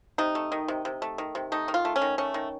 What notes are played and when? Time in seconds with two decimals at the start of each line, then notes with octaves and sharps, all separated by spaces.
0.18 C3 D#4
0.35 A3
0.52 D#3
0.68 C3
0.85 C3
1.02 A3
1.18 D#3
1.35 C3
1.52 A3 D#4
1.68 D#3
1.74 F4
1.85 A3
1.96 C#4
2.02 D#3
2.18 A3 C#4
2.34 D#3